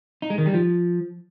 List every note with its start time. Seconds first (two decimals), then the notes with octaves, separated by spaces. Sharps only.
0.22 D#4
0.30 G#3
0.38 D#3
0.46 G3
0.54 F3